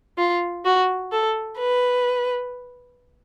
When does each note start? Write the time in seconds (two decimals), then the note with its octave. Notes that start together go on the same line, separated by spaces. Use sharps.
0.18 F4
0.65 F#4
1.11 A4
1.59 B4